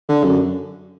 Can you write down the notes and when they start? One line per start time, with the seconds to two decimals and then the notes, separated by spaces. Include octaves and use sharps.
0.09 D3
0.24 F#2